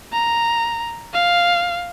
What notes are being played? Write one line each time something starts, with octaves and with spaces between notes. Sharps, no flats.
A#5
F5